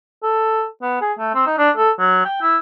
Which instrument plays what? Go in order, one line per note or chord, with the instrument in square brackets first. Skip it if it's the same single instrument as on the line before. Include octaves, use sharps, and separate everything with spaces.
[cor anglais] A4
B3
G#4
A3
C4
D#4
D4
A4
F#3
G5
E4